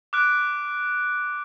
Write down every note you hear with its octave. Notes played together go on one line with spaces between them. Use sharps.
D6 F6 F#6 D7